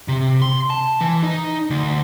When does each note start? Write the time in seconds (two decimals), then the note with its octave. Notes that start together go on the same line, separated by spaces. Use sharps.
0.08 C3
0.42 C6
0.70 A5
1.01 E3
1.23 D#4
1.70 D2